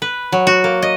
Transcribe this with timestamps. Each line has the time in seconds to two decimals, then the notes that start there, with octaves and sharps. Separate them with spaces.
0.02 B4
0.32 F#3
0.47 F#4
0.64 A#3
0.82 D#5